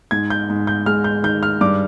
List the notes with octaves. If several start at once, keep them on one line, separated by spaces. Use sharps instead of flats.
G#2 G#6
G6
G#2
G6
G#3 F6
G6
D#3 G6
F6
G2 D6